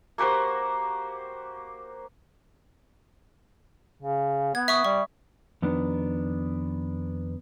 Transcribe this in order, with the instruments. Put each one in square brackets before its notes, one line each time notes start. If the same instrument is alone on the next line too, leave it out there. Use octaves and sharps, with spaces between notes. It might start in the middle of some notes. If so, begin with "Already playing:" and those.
[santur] A#3 F#4 G4 C5
[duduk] C#3
[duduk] B3 [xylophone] G#6
[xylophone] E5 C#6 D#6
[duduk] G3 [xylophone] C#6
[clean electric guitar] F2 D#3 B3 D4